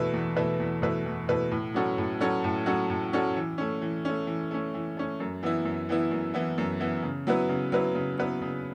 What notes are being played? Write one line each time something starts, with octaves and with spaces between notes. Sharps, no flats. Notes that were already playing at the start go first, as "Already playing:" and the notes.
Already playing: E2 B2 A3 E4 B4
E2
B2 A3 E4 B4
E2
B2 A3 E4 B4
E2
B2 A3 E4 B4
A2
F#3 C#4 F#4 A4
A2
F#3 C#4 F#4 A4
A2
F#3 C#4 F#4 A4
A2
F#3 C#4 F#4 A4
E3
A3 C#4
E3
A3 C#4
E3
A3 C#4
E3
A3 C#4
F#2
E3 B3 E4
F#2
E3 B3 E4
F#2
E3 B3 E4
F#2
E3 B3 E4
C#3
F#3 B3 E4 B4
C#3
F#3 B3 E4 B4
C#3
F#3 B3 E4 B4
C#3